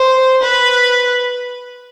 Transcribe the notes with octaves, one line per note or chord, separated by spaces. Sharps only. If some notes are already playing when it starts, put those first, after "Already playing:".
Already playing: C5
B4